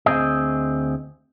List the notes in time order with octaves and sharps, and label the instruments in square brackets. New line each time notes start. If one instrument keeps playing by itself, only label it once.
[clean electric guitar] D2 C4 G#4 D#5